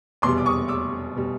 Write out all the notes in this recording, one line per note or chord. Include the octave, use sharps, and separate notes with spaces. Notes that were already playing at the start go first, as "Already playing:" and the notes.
F1 E2 B2 G3 C6 D6
D6
C#6 D#6
D6 E6
B2 G3